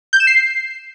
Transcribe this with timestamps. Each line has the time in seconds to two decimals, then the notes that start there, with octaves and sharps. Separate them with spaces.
0.13 G6
0.20 E7
0.27 C7